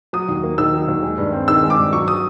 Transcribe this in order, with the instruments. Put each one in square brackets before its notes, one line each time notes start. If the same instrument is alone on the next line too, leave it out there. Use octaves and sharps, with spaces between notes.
[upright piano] F#3 D#6
D#2
A#3
D#3 E6
F#3
D#2
G#3
G2
C4
D#3 E6
G#3
D6
G2
F#3 C#6
D#6